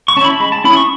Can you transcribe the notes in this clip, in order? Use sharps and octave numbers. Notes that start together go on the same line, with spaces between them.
C#6
C#4 E4 A5 B5
G#3 B5
A5
C#4 E4 B5
D#6
C#6